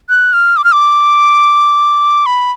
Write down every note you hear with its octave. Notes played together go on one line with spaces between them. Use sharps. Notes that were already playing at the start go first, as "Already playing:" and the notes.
F#6
F6
D6
F6
D6
B5